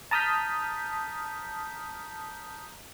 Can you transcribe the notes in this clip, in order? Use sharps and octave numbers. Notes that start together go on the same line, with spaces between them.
A5 A#5 D#6 F6 G6 B6